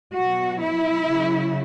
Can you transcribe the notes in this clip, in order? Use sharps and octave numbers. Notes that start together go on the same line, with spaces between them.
B2 F#3 F#4
E4
C#3 F#3